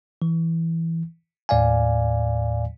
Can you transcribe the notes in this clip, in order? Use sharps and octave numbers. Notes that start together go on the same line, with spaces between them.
E3
D#2 A2 D5 F5 G#5